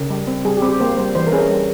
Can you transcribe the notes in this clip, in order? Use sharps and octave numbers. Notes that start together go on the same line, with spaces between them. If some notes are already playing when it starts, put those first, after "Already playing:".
Already playing: C#3 A#4
G3
C4
G3 G#4
G4
C4
G4
A#3 C5
G3 C5
E3 C5
A#4
C#4 G#4
A#4
G3